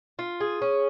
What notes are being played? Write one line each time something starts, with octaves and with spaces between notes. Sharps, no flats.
F4
G#4
C#4